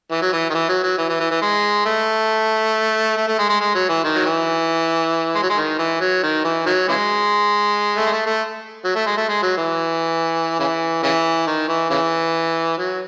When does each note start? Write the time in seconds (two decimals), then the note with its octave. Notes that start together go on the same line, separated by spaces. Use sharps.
0.11 E3
0.22 F#3
0.33 E3
0.50 D#3
0.54 E3
0.69 F#3
0.83 F#3
0.98 E3
1.09 E3
1.20 E3
1.31 E3
1.42 G#3
1.86 A3
3.17 A3
3.28 A3
3.38 G#3
3.49 G#3
3.60 G#3
3.75 F#3
3.89 E3
4.04 D#3
4.15 F#3
4.26 E3
5.35 G#3
5.42 F#3
5.49 G#3
5.57 D#3
5.79 E3
6.00 F#3
6.23 D#3
6.44 E3
6.66 D#3 F#3
6.88 C#3 E3 G#3
7.97 A3
8.06 G#3
8.12 A3
8.26 A3
8.85 F#3
8.95 A3
9.06 G#3
9.17 A3
9.28 G#3
9.42 F#3
9.57 E3
10.59 C#3 E3
11.03 C#3 E3
11.47 D#3
11.68 E3
11.90 C#3 E3
12.78 F#3